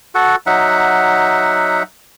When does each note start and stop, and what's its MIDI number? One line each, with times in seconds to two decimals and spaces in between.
0.15 0.36 66
0.15 0.36 69
0.15 0.36 78
0.46 1.83 54
0.46 1.83 63
0.46 1.83 76
0.46 1.83 78